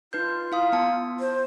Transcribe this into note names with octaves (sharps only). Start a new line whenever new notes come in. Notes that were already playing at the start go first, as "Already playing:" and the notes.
D#4 F4 B4 G6
E4 F5 D#6
B3 A5
C5